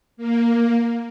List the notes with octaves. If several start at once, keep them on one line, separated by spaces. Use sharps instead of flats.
A#3